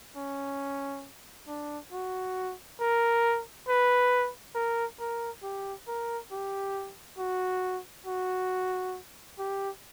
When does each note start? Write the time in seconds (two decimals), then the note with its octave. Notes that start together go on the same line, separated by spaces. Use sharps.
0.17 C#4
1.48 D4
1.92 F#4
2.80 A#4
3.68 B4
4.55 A#4
5.00 A#4
5.43 G4
5.88 A#4
6.31 G4
7.19 F#4
8.07 F#4
9.39 G4